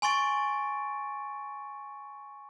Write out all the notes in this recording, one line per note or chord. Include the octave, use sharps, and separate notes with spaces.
G#5 C6 C#6 A6 D7